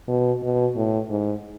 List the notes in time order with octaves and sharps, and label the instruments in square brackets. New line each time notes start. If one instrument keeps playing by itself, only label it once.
[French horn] B2
B2
A2
G#2